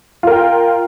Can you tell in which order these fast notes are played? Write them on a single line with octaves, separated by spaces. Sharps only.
F4 A#4 G5